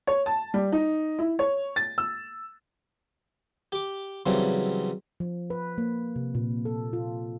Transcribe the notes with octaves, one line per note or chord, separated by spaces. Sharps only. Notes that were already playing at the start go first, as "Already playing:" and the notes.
C#5
A5
G3
D#4
E4
C#5
A6
E6
G4 D6
C#3 E3 F#3 G3 C4
F3
B4
A#3
C3
A#2
A4
F4